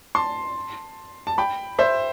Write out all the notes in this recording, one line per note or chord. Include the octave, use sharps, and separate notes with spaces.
A5 C6
A5
G5 B5
C5 E5